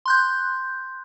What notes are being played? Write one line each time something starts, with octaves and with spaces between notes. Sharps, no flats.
C6 F#6 G6